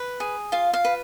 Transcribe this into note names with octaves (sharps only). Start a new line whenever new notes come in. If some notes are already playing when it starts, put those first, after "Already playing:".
Already playing: B4
G#4
F4 F5
F5
B4